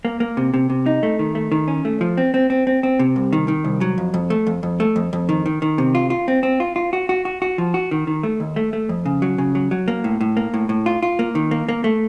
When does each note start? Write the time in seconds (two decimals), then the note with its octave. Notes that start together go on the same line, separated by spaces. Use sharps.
0.05 A#3
0.20 A#3
0.37 C3
0.54 C3
0.70 C3
0.86 D#4
1.03 A3
1.19 D#3
1.35 A3
1.52 D#3
1.68 C#4
1.85 A3
2.01 F3
2.17 C4
2.34 C4
2.50 C4
2.67 C4
2.83 C4
2.99 C3
3.16 C2
3.33 D#3
3.48 D#3
3.64 C2
3.81 F#3
3.98 F2
4.14 F2
4.30 A3
4.47 F2
4.63 F2
4.80 A3
4.96 F2
5.13 F2
5.29 D#3
5.46 D#3
5.62 D#3
5.78 C3
5.95 F4
6.10 F4
6.28 C4
6.43 C4
6.60 F4
6.76 F4
6.93 F#4
7.09 F#4
7.25 F#4
7.42 F#4
7.58 F3
7.74 F#4
7.91 D#3
8.07 D#3
8.23 A3
8.40 D#2
8.56 A3
8.73 A3
8.89 F2
9.06 C#3
9.22 F#3
9.38 C#3
9.55 F#3
9.71 F#3
9.88 A#3
10.04 A2
10.21 A2
10.37 A#3
10.54 A2
10.69 A2
10.86 F4
11.02 F4
11.19 A#3
11.35 D#3
11.51 A#3
11.69 A#3
11.84 A3